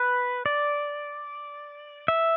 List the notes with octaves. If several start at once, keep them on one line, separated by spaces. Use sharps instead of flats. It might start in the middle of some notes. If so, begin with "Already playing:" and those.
Already playing: B4
D5
E5